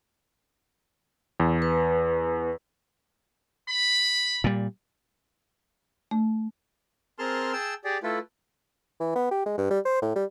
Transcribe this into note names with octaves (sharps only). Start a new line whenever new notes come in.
E2
B4
B5
A#2 G3
A3
C4 G#4 A#4 A5 C6 F6
G#4 G5 A5 E6
G4 G#4 D5
A3 E4 F4 A4 B4
E3
B3
G4
G#3
G2
G3
C5
A2
G3